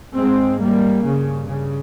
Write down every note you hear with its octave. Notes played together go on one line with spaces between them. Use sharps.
G#2 G#3 C4
G3 A#3
G2 C#3
C#3